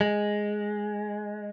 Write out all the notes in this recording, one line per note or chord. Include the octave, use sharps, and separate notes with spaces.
G#3